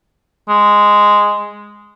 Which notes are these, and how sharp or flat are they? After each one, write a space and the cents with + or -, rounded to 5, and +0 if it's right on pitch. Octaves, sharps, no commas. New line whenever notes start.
G#3 -5